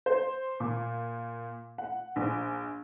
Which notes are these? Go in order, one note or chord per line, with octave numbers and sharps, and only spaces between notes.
C5
A#2
F#5
A#1